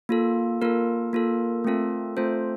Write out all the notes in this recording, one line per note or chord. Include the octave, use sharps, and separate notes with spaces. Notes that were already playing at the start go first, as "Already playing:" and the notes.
A#3 F4 A4
A#3 F4 A4 A#4
A#3 F4 A4
A3 C4 F4 A4
A3 C4 F4 A4 C5